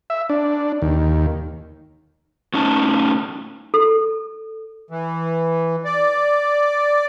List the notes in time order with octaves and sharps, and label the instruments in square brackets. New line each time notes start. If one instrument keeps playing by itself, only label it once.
[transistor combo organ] E5
D4
D#2
[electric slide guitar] A2 C#4 D#4 A5
[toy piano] A4
[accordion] E3
D5